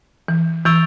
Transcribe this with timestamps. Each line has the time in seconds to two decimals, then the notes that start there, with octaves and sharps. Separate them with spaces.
0.28 E3
0.65 E3 C#6 E6 A6 D7 F7